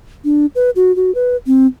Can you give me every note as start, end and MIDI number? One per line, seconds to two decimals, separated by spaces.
0.25 0.46 62
0.55 0.70 71
0.76 0.94 66
0.96 1.14 66
1.15 1.36 71
1.47 1.67 60